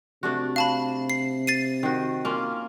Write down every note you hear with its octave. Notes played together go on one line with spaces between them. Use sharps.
C3 A3 D4 F#4
F5 A5 B5
C7
A6 C7 D#7
D#3 F#4
A#3 C#4 F4